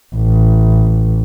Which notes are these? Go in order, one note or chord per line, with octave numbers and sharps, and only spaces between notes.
A1